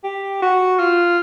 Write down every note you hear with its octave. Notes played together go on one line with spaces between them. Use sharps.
G4
F#4
F4